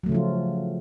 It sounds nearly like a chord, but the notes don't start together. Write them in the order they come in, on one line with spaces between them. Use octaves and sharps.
F#3 A3 C#3 F3 F4